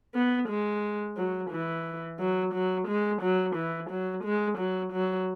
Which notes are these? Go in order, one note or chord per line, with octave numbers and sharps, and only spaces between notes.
B3
G#3
F#3
E3
F#3
F#3
G#3
F#3
E3
F#3
G#3
F#3
F#3